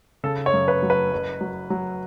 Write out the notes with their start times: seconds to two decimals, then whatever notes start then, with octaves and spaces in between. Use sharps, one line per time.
0.24 C#3 A4
0.46 C#5
0.53 F#2
0.68 B4
0.82 F#3
0.90 B4
1.12 F#1
1.41 F#3
1.70 F#3